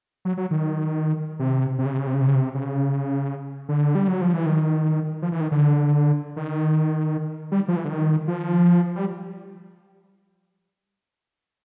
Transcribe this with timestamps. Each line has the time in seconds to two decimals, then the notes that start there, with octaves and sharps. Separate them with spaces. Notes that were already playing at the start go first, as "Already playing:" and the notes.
0.25 F#3
0.37 F#3
0.51 D#3
1.39 C3
1.79 C3
1.86 C#3
1.93 C3
1.99 C#3
2.07 C3
2.14 C#3
2.21 C3
2.28 C#3
2.35 C3
2.55 C#3
3.69 D3
3.95 G3
4.08 F#3
4.21 F3
4.34 E3
4.46 D#3
5.22 F3
5.32 E3
5.41 D#3
5.51 D3
6.36 D#3
7.52 G3
7.68 F3
7.76 E3
7.85 D3
7.89 D#3
8.28 F3
8.95 G3